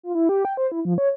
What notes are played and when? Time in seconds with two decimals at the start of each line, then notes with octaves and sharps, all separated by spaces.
0.03 F4
0.15 E4
0.29 G4
0.45 G5
0.57 C5
0.72 E4
0.85 F3
0.98 C#5